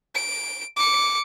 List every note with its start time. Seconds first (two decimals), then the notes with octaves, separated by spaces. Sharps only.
0.15 D7
0.77 D6 C#7